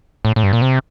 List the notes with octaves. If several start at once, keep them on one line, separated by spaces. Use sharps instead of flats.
A2
A2
G2
A#2
C3